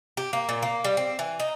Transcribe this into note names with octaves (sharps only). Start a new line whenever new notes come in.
G4
A#3
A#2
A#3
G3
C4
E3
D#4